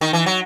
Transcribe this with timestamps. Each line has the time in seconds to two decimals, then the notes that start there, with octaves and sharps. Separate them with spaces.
0.01 D#3
0.13 E3
0.26 F#3